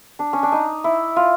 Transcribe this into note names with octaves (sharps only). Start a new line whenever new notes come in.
D4
C#4
D4
D#4
E4
F4